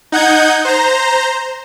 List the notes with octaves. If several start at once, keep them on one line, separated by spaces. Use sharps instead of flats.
D#4 F#5 G6 G#6
C5 A#5